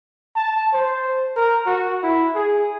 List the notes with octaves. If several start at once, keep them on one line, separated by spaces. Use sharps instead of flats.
A5
C5
A#4
F#4
E4
G#4